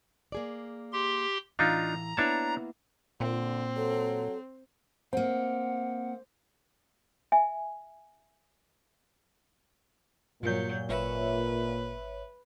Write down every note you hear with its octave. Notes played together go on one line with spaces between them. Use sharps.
A#3 G#4 D5
G4 C6
A2 E3 D4 D#4 F4 F5 A#5
A#3 B3 D4 E4 C#5 A5
A#2 D3 C4
F#3 A4
A#3 C4 C5 F#5
E5 G#5
G2 A#2 F#3 G6
G#1 B4 C#5 E5